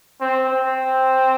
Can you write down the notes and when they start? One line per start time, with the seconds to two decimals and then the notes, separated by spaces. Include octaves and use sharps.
0.21 C4
0.50 C4